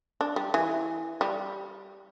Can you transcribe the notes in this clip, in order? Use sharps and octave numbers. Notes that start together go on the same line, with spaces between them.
D4
G3
E3
G3